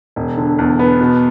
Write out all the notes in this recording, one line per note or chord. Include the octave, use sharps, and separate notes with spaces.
E1
D3
E2
B3
B2